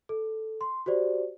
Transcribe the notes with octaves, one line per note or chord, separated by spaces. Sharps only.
A4
C6
F#4 G4 C5 D5